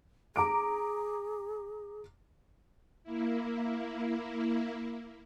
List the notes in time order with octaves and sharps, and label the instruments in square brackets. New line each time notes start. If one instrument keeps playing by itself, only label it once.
[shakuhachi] G#4 [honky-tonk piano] A#5 D6 D7
[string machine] A#3 E4